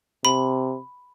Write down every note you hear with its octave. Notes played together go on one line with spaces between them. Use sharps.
C3 B5